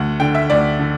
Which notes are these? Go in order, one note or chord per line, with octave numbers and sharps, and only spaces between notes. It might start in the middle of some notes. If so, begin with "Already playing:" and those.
Already playing: D2 F#5
D3 G5
E5
D2 D5
D3